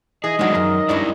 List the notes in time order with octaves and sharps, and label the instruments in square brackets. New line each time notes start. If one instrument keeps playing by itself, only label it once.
[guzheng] E3 [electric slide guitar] G#4 [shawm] D#5
[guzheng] D#3 F#3 [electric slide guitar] G#3 D4 F#4
[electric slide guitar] F#2 [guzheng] A#4
[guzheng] G2 G#3 C#4 [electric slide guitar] E4 D5